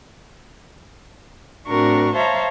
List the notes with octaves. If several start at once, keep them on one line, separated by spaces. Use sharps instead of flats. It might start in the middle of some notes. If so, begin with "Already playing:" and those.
A2 C4 D4 F#4 A#4 C#6
C5 C#5 E5 F5 A5 A#5